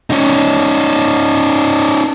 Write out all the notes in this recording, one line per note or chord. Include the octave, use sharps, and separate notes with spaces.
C#4 D#4